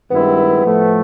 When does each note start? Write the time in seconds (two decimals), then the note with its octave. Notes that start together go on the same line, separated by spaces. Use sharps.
0.11 G2 D#3 G#3 B3 C4 E4
0.64 A2 F3 A3